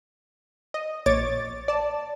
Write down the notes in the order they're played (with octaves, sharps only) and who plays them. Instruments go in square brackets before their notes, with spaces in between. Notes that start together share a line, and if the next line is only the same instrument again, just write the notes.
[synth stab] D#5
A#1 C#5 D6 A6
D5 A5